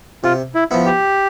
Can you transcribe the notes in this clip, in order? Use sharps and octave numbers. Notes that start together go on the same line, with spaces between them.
C3 F4
E4
F3 B3 E4
G4